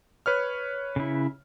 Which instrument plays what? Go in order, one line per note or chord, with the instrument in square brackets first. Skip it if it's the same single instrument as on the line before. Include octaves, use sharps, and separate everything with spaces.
[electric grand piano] B4 C#5 F6
[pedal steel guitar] C#3 E4